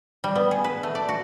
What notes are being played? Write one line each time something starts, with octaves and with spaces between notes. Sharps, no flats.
G3
B3
G#4
B4
A3
D5
F#4